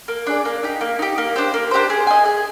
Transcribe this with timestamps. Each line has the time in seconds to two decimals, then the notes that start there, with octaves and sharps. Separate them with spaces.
0.08 A#3
0.27 D4 G#4 D5
0.45 A#3
0.63 D#4 G4
0.81 A#3
0.99 D#4 G4
1.18 A#3
1.36 D4 G4 C5
1.54 A#3
1.71 D4 G4 C5
1.90 G#4
2.07 D#5 G#5
2.25 G#4